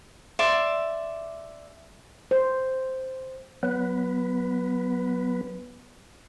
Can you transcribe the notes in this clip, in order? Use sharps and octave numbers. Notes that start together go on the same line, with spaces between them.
D5 E5 C6
C5
F#3 B3 B4